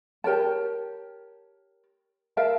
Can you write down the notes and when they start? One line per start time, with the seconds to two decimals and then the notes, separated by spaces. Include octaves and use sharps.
0.24 G4 A#4 C#5 A5
2.37 A#4 E5 F5 A5